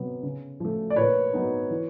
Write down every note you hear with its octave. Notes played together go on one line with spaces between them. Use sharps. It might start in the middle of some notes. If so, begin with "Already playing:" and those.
Already playing: C3 F#3 B3
C#3
F3 A3
D5
A#2 B4 C#5
F#3 B3 D#4
E3